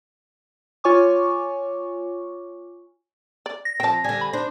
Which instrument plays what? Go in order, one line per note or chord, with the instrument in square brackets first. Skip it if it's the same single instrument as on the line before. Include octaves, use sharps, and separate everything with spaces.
[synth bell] F4 C#5 G#5 C#6 D6
[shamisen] D5
[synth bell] A#6
[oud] F3 C4 [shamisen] G5 A5
[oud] D3 G3 [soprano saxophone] G#5
[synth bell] B5
[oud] D4 [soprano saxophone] C5